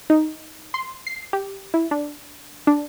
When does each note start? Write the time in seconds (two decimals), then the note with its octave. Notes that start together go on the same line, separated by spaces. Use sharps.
0.10 D#4
0.74 C6
1.07 C7
1.33 G4
1.74 E4
1.91 D4
2.67 D4